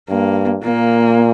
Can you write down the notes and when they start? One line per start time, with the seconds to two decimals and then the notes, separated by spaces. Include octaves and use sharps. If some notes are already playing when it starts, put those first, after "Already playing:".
0.09 G2 A#3
0.63 A#2 A#3